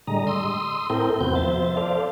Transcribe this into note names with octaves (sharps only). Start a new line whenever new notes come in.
A2 D3 G3 G#3 D#5 A#5
C6 D#6 E6
A2 C4 E4 A4 A#4 G5
E2 C3 B3 C4 F#4 G6
F3 C5 E5 A6
A4 C5 D5 F5